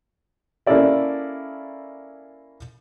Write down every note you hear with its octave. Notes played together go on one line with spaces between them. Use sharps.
A#3 C#4 E4 A4 D5 E5